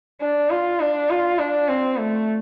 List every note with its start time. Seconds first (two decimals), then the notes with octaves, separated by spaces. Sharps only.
0.21 D4
0.50 F4
0.80 D4
1.10 F4
1.39 D4
1.68 C4
1.98 A3